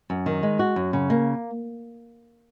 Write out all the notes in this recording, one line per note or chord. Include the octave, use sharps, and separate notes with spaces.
F#2
D#3
G#3
F#4
F#2
C#3
A#3